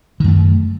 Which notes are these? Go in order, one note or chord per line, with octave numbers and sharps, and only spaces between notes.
F#2 D#3 A3